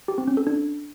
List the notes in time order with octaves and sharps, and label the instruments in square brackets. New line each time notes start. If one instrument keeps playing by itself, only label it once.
[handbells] G4
C4
C#4
A4
D4